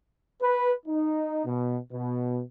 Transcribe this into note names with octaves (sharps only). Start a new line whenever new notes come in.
B4
D#4
B2
B2